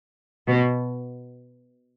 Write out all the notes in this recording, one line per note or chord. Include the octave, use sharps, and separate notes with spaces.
B2